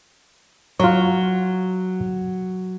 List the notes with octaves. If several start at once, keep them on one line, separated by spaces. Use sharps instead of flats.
F#3 F4 C#5